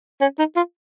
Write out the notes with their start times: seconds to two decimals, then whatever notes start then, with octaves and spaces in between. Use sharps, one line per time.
0.21 C#4
0.39 D#4
0.56 F4